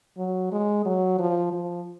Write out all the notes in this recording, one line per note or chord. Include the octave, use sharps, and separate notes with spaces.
F#3
G#3
F#3
F3
F3